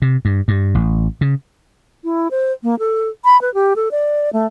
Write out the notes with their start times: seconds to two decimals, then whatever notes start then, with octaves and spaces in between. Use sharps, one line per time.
0.02 C3
0.25 G2
0.48 G2
0.75 A1
1.21 C#3
2.04 E4
2.31 C5
2.63 A#3
2.79 A4
3.25 B5
3.41 B4
3.54 G4
3.76 A4
3.91 D5
4.33 A3